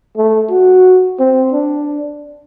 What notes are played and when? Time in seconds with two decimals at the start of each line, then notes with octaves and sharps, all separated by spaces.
0.17 A3
0.51 F#4
1.20 C4
1.52 D4